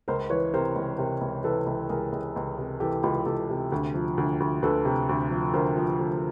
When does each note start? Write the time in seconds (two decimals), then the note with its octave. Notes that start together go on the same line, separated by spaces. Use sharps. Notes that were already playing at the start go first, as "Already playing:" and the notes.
0.08 C#2 A#4 C5
0.30 E3 B4 C#5
0.53 C3 A#4 C5
0.76 C#2
0.98 C3 A#4 C5
1.21 C#2
1.44 E3 A4 B4
1.66 C#2
1.89 C#2 G#4 A#4
2.12 C#2
2.36 C#2
2.58 C3
2.80 E3 G4 A4
3.03 C#2 F4 G4
3.26 C#2 G4 A4
3.49 C3
3.72 D2
3.94 F3
4.18 D2
4.40 D2
4.62 D2 A4 B4
4.85 C3
5.09 D2
5.31 F3
5.53 D2 A#4 C5
5.77 F3
5.99 D2